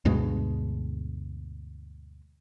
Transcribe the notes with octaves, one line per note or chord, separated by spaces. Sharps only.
D2 G2 B2 G#3